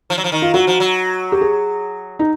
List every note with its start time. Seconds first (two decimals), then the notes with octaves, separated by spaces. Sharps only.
0.10 F3
0.18 F#3
0.24 F3
0.32 D#3
0.42 F4
0.54 F#3 F#4
0.67 F3
0.80 F#3
1.32 G4
1.41 G#4
2.19 D#4